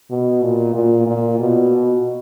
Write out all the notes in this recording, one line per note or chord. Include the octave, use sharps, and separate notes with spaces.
B2
A#2
A#2
A#2
B2